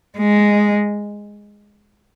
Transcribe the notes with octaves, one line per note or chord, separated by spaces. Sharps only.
G#3